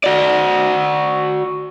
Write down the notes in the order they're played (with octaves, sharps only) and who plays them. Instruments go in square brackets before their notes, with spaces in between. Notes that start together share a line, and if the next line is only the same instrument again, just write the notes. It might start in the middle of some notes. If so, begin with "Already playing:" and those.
[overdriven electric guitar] F#4 D5